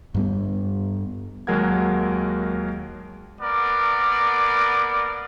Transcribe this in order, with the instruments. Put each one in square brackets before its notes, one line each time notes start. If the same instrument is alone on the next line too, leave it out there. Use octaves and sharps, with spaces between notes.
[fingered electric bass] G2 G3 B3
[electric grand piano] D#2 F#3 G#3 A#4 F#5 G#6
[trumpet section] A#3 B3 A#4 D5